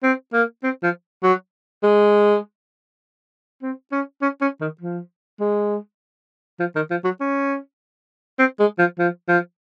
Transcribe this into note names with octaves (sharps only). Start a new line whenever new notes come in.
C4
A#3
C4
F3
F#3
G#3
C4
C#4
C#4
C#4
D#3
F3
G#3
F3
D#3
F3
F#3
C#4
C4
G#3
F3
F3
F3